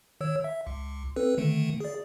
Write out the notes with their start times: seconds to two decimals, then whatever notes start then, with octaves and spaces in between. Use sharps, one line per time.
0.21 D#3 C#5 E6
0.44 E5
0.67 C#2
1.16 C4 A4 B4
1.38 D3 D#3 A3
1.80 G#4 D5